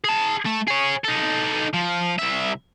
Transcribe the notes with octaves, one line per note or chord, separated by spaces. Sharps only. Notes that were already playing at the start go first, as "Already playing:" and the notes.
G#4 A5
A3
G#4 C#5
D#4 A4
F3
C2 E5